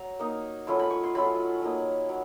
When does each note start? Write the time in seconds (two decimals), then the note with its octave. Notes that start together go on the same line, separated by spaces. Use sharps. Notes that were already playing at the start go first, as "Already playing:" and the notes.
Already playing: F#3 A#5
0.19 A#3 D#4
0.67 F#3 A3 C#4 F4 B5
0.79 B5
0.90 C#6
1.03 C6
1.15 F#3 A3 C#4 F4 B5
1.62 F#3 A#3 D#4
2.09 F#3